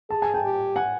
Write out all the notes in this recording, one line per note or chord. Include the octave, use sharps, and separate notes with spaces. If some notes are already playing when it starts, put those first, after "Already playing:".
G#4 A5
G#5
G5 A5
G4
F#5 G#5